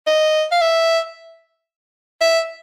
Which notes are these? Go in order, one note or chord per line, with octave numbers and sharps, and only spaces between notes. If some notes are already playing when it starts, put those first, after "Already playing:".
D#5
F5
E5
E5